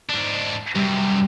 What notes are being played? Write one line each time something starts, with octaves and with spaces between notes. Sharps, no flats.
G#2 D4
F#2 C3 G3